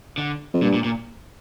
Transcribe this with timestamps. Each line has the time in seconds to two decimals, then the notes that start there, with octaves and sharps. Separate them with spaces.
0.18 D3
0.54 F2
0.62 G2 A#2
0.74 A#2
0.84 A#2